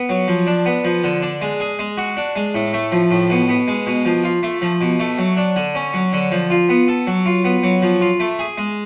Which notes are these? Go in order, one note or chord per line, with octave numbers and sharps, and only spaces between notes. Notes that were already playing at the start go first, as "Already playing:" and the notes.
Already playing: B3
F#3
F3
D4
B3
F3
D3
D4
G#3
G#4
G#3
F#4
D4
G#3
A2
A3
F3
A2
B2
B3
G#3
B2
F3
F4
A3
F3
B2
A3
F#3
D4
D3
C#4
F#3
D3
F3
F4
B3
A4
F#3
F4
B3
F#3
F3
F4
A3
G#4
G#3